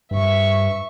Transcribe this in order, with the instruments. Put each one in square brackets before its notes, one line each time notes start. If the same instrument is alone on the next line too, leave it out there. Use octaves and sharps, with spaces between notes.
[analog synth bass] G2 [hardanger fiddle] E5 C#6